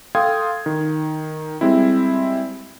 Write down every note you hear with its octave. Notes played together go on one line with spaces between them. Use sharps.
A4 F5 G5 C6 D#6 G#6
D#3
G3 G#3 C4 E4